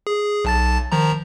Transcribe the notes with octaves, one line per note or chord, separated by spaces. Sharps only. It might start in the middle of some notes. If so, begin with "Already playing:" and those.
G#4
B1 A5 A6
D#3 F3 A#5